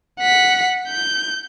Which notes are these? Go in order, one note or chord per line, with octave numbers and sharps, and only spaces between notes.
F#5 B6
G6